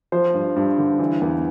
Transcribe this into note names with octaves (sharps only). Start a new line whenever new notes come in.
F3 C5
G2
G2
D3
E3
E2